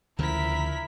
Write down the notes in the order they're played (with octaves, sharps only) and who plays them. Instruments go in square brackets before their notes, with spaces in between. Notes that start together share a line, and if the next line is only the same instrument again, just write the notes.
[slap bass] D2 C#3 F3 [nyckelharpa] E4 [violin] A#4 B6